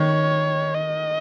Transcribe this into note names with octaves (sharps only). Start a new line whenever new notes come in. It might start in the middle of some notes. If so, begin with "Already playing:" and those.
Already playing: D#3 C#5
D#5